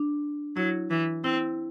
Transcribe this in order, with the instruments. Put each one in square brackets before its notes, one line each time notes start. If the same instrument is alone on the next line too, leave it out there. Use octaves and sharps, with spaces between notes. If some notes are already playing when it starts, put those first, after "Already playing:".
Already playing: [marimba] D4
[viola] F#3 [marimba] E4
[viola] E3
[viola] C4 [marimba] E4